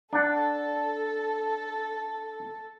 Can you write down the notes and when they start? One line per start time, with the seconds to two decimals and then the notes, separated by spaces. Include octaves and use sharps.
0.13 D4 A4 F#5